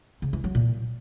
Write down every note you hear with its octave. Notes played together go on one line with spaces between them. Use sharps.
C#3
E3
F#3
A#2